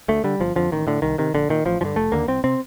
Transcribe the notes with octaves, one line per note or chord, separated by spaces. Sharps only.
D2 A3
D3 G3
G1 F3
F2 D3 F3
A1 D#3
A2 D3
C2 D#3
C3 D#3
A#1 D3
A#2 D#3
A1 F3
G2 D3 F3
F1 A3
D#2 D3 A#3
C2 C4
C3 C4